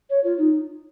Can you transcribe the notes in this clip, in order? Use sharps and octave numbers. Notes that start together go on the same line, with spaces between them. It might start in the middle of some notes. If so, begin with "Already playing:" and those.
C#5
F4
D#4